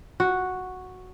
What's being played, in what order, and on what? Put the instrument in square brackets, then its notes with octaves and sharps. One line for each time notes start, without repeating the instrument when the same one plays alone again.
[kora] F#4